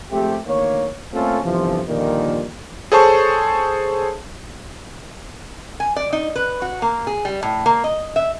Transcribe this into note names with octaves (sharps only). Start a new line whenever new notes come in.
F3 G#3 A3 C4 G4
D2 D#3 A#3 C#5
A3 A#3 C4 C#4 F4 A4
G1 C3 E3 F3
A#2 D3 D#3 F3 G3 A#3
G#4 A4 C5 C#5 A5 C#6
G#5
D5
D#4
B4
F#4
A#3
G#4
G3
A2
A#3
D#5
E5